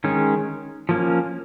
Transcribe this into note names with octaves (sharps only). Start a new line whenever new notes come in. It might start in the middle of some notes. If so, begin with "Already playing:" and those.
D#3 G#3 C#4
F3 A#3 C#4